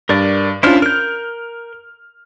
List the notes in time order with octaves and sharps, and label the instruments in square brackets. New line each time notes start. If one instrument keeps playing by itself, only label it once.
[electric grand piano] G2 [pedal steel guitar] A#4 D5
[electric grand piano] C#4 D4 F4 [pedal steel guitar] E4 C5 F6
[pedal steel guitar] A#4 G6 [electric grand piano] F6